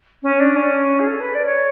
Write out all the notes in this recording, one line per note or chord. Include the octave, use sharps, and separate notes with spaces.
C#4
D4
C#4
G#4
A4
B4
D5
C#5